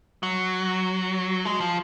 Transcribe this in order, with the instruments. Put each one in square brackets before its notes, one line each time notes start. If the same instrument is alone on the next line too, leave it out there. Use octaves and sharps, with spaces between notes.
[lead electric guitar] F#3
G#3
F3